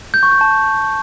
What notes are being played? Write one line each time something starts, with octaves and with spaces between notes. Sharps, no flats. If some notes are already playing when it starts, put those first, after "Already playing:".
G6
C#6
G6
A5